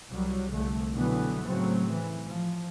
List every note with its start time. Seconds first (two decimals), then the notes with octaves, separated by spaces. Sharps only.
0.12 C2 F#3 G3
0.50 C2 D3 A3
0.93 B2 D3 E3 F#3 B3
1.46 A2 C#3 F#3 C4
1.92 E3
2.27 F3